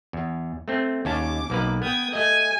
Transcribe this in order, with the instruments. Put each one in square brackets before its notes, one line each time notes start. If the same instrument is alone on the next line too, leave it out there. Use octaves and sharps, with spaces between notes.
[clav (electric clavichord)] E2
A3 C4
[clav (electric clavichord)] D#2 C#4 A5 [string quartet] D6
[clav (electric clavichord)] B1 A#3 B4
[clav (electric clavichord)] B3 [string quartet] G5 D#6 G#6
[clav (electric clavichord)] A3 D#5 [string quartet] G#5